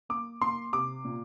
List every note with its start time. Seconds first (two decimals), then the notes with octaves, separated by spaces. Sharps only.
0.09 A#3 D6
0.41 A#3 C6
0.73 C3 D6
1.05 A#2